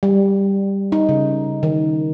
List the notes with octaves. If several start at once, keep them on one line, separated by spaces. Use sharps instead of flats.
G3
D#4
C#3
D#3